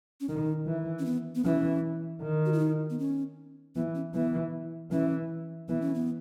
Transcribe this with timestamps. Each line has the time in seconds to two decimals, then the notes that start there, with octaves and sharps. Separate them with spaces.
0.21 C#4
0.29 D#3 D#4
0.67 E3
0.99 C#4
1.06 B3
1.35 B3
1.44 E3 C#4
2.22 D#3
2.46 F#4
2.53 E4
2.59 D#4
2.90 B3
2.99 C#4
3.75 E3 B3
3.95 C#4
4.14 E3 B3
4.91 E3 C#4
5.68 E3 B3
5.81 C#4
5.95 B3